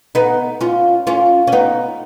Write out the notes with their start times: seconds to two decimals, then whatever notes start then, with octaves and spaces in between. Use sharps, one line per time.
0.15 B3 D#4
0.61 C#4 F4
1.07 C#4 F4
1.47 C#4
1.52 B3 D#4